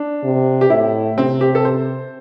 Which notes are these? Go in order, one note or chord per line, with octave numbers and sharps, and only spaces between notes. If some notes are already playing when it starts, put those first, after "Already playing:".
Already playing: D4
C3
G4
A2 E4
C3 C4
G4
A4
C5